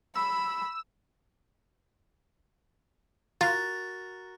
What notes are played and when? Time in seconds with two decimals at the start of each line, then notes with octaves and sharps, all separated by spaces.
0.15 B5 E6
3.41 F4 F#4 A#4 A6